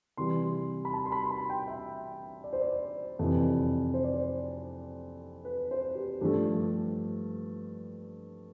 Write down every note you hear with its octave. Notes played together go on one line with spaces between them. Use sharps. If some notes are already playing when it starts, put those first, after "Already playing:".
C3 E3 G3 C6
B5
A5
C6
B5
C6
B5
G5
E5
D5
C5
D5
F2 C3 E3
C5
D5
C5
B4
C5
G4
G2 F3 A3 G4